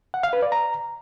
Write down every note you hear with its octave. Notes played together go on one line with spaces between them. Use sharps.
F#5
F5
B4
D5
A#5